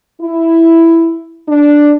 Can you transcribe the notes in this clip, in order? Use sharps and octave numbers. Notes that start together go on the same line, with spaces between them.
E4
D4